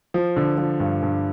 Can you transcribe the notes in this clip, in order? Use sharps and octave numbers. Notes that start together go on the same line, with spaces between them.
F3
D3
F3
G2
G2